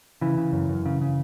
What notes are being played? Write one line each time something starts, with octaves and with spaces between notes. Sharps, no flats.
C#3 E3
C#3
F#2
F#2
C#3
C#3